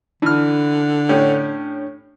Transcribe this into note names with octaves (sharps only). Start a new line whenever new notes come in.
D3 E3 D4 F6
A2 C#4 G4